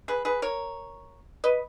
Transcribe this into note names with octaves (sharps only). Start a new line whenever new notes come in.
G#4 B4
G#4 B4
A#4 C#5
B4 D#5